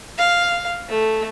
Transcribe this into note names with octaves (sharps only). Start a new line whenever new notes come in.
F5
A3